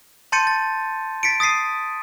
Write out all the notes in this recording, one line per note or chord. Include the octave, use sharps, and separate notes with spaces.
A5 C6 G6 A6 C#7 D#7
A6
A6 B6 C#7 D7
D#6 A6 B6 C7 D#7